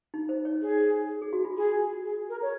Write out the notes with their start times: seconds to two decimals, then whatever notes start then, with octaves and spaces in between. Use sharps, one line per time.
0.14 D#4
0.29 C5
0.45 C#5
0.61 G#4
1.22 G#4
1.33 F#4
1.45 F4
1.56 G#4
2.05 G#4
2.29 A#4
2.42 C#5